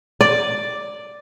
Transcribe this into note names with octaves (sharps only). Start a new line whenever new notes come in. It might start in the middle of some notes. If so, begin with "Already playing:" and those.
D5